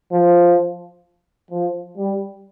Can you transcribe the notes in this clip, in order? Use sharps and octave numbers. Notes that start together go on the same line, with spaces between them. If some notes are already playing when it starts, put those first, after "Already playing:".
F3
F3
G3